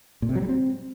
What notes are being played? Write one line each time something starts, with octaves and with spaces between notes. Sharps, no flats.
A#2
C3
F#3
G3
C4